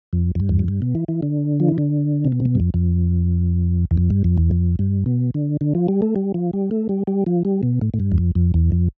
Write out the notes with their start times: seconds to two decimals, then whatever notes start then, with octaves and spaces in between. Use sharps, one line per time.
0.13 F2
0.35 F2
0.40 G2
0.49 E2
0.59 F2
0.68 G2
0.82 B2
0.95 E3
1.08 E3
1.22 D3
1.60 F3
1.69 E3
1.78 D3
2.25 C3
2.32 B2
2.40 C3
2.45 B2
2.55 G2
2.60 F2
2.74 F2
3.91 E2
3.97 F2
4.10 G2
4.24 F2
4.38 E2
4.51 F2
4.79 G2
5.06 B2
5.34 D3
5.61 D3
5.75 F3
5.88 G3
6.02 A3
6.16 G3
6.34 F3
6.53 G3
6.71 A3
6.89 G3
7.07 G3
7.26 F3
7.45 G3
7.63 B2
7.81 A2
7.94 A2
8.00 G2
8.12 E2
8.18 F2
8.35 F2
8.54 E2
8.72 F2